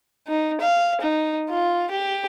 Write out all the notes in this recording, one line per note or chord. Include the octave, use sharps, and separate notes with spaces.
D#4
F5
D#4
F4
G4